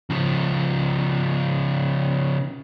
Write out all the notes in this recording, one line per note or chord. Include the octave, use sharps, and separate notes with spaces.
C#3 F3